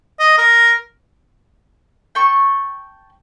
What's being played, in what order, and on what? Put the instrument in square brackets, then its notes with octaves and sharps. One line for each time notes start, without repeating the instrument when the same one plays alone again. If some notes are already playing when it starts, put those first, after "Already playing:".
[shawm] D#5
A#4
[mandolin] G5 A5 C#6